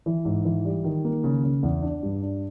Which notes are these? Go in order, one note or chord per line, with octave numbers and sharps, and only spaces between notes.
E3
G#2
E3
G3
D#3
A#3
C#3
C#3
E2
D4
G2
D4